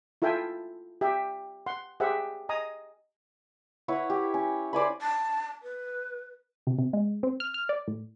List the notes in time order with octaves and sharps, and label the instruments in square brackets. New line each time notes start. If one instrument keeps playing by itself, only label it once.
[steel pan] E4 F4 A4 E5 G5 G#5
G4 E5 G5
F#5 C6
G4 G#4 C5 E5 F#5
D#5 G#5 A#5 D#6
[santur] E4 B4 C#5 F#5
G4
C#4
C5 D5 G#5 B5
[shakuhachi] A5
B4
[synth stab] C3
C3
G#3
C4
F6
F6
D5
A2